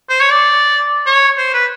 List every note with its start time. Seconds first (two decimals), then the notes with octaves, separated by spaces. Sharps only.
0.10 C5
0.21 C#5
0.31 D5
1.06 C#5
1.37 C5
1.53 B4